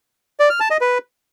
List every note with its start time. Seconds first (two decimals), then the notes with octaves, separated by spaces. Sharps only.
0.40 D5
0.50 F6
0.60 A5
0.70 D#5
0.81 B4